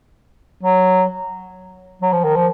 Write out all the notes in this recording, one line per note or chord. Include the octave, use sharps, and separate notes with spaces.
F#3
F#3
F3
D#3
F3